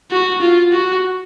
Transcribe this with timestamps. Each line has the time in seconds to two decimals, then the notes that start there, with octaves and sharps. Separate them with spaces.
0.11 F#4
0.42 F4
0.73 F#4